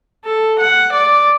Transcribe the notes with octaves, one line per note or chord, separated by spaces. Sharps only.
A4
F#5
D5